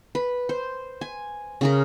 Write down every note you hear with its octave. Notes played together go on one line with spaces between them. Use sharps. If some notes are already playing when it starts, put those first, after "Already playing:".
B4
C5
G#5
C#3 G#4 A#4